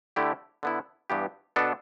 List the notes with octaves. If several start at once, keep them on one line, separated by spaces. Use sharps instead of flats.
D3 A3 E4 G4
D3 B3 E4
G2 E3 B3 G4
B2 B3 D4 A4